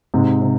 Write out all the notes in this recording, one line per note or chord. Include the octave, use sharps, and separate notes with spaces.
G#2 C3
C3